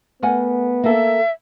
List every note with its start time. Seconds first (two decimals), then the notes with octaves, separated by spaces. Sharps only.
0.23 A3 B3 A#4 F#5 G#5
0.84 A#3 A4 E5